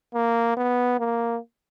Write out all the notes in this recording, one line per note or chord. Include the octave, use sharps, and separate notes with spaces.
A#3
B3
A#3